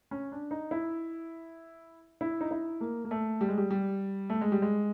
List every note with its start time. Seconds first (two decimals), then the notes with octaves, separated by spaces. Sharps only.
0.11 C#4
0.32 D4
0.51 D#4
0.71 E4
2.21 E4
2.41 D#4
2.51 E4
2.81 A#3
3.05 A#3
3.11 A3
3.41 G3
3.49 G#3
3.58 G3
3.71 G3
4.30 A3
4.41 G#3
4.52 G3
4.62 G#3